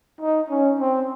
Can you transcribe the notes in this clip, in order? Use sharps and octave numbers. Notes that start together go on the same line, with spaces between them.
D#4
C#4
C4